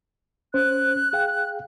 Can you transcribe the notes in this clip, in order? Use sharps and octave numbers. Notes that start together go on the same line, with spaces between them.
C#4 C5 F#6
G#4 F5 G5